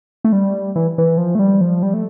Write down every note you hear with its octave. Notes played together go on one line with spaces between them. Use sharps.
A3
G3
E3
E3
F3
A3
G3
F3
G3
A3